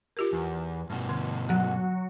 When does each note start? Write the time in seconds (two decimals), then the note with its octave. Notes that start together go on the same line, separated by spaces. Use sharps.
0.17 F4 G4 A#4
0.33 E2
0.90 G2 B2
1.09 D3
1.49 F#3 F#4